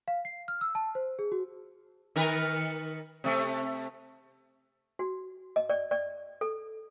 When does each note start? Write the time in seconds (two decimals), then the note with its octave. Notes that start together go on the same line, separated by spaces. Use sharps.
0.08 F5
0.25 C7
0.48 F6
0.61 E6
0.75 A5
0.95 C5
1.19 G#4
1.32 F#4
2.16 D#3 A#4 B4
3.24 C3 A3
4.99 F#4
5.56 D#5
5.70 D5
5.91 D5
6.41 A4